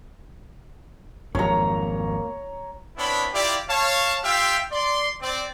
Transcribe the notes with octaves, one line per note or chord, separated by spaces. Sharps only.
G#1 F2 F#3 A#3 C#5 A#5
B3 C4 D4 E4 C#5 B5
E4 F4 G4 D5
C#5 F5 A5
F4 G4 E5 F5 G5
D5 C6
C4 D5